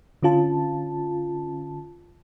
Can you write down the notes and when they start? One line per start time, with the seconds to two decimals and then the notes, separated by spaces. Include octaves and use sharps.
0.23 D3 C#4 F4 A5